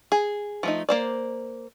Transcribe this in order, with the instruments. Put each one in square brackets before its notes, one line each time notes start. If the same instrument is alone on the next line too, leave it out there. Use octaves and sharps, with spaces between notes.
[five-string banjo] G#4
F3 A3 D#4
A#3 C5 D5